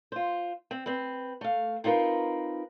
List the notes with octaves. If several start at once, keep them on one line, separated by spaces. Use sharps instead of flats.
F4 C5
C4
C4 B4
A3 F5
C4 D#4 F4 A#4 B4